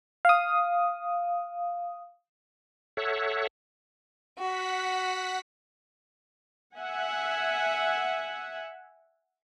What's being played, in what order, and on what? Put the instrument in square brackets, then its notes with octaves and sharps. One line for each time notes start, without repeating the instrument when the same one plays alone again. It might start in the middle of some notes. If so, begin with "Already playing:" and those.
[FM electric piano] F5 D#6
[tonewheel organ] A4 C#5 E5 F#5
[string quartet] F#4 [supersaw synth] F#5 B6
[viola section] E5 F#5 G#5